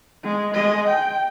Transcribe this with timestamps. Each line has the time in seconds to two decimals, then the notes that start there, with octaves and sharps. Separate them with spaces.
0.23 G#3
0.54 G#3 D#5
0.88 G5